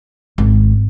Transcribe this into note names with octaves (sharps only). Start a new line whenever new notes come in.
G#1